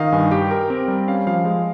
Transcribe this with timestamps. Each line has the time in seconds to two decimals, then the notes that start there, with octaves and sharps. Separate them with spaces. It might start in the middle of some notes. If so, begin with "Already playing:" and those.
Already playing: D#3 D#5 F5
0.12 G2 G#5
0.31 G4 G5
0.51 A#4
0.70 C4
0.88 G3
1.07 C#4 F5
1.27 F3 F5
1.45 G#3